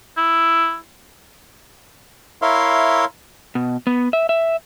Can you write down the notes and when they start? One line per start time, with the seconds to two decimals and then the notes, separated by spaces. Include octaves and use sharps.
0.17 E4
2.42 E4 A#4 C#5 E5 F5 C6
3.55 B2
3.87 B3
4.13 E5
4.29 E5